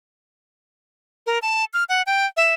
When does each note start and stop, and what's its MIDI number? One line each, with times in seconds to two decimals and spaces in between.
1.27 1.39 70
1.42 1.65 81
1.74 1.84 89
1.89 2.02 78
2.06 2.26 79
2.37 2.54 76